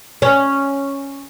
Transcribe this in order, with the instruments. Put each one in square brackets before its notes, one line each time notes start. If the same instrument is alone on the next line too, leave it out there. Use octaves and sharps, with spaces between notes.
[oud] C#4